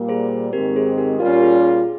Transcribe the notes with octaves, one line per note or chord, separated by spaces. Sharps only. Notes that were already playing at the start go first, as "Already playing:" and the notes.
Already playing: A#2 G3 A#3
G#4 C5
G#2 D#3 G#3 C4 G4 A#4
G#4 C5
G4 A#4
A#2 G3 C#4 F4 G4 A#4
G#4
G#4